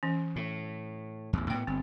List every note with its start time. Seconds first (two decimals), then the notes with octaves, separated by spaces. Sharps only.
0.03 E3 C#4
0.36 A2
1.33 A1 E2
1.50 A2 A#3 B3 G5
1.67 G1 C4